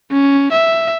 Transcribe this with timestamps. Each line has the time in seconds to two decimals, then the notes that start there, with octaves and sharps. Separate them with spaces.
0.12 C#4
0.52 E5